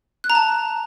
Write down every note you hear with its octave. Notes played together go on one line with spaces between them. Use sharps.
F#6
A#5
A5